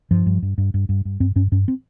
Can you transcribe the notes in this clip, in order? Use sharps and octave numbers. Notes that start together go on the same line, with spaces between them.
G2 F3
G2
G2
G2
G2
G2
G2
G2 C4
G2 C#4
G2 C#4
C4